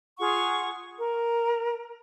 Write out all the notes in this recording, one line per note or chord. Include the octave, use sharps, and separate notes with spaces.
F4 G#4 F#5 C#6
A#4